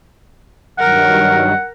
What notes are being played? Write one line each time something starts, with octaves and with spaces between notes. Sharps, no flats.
G2 D#3 F#3 A#4 F#5